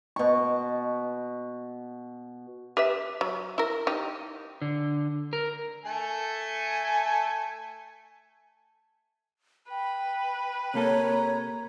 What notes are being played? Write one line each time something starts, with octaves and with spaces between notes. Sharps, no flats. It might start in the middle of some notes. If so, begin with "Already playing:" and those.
B2 C#6
G4 B4 E5
F#3
E4 A#4
D#4 G4
D3
A#4
A3 A4 G#5
B4 G5
C3 A#3 A4 C#5 A#5